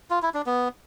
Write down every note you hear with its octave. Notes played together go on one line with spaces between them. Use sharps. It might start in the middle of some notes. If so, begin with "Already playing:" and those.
F4
E4
D4
B3